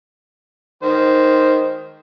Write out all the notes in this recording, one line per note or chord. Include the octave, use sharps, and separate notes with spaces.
D#3 C5